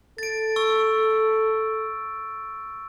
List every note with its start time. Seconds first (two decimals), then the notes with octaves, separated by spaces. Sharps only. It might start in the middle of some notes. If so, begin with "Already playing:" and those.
0.18 A4 A6 D7
0.56 C#6 E6